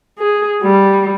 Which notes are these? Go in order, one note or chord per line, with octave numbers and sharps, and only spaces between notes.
G#4
G3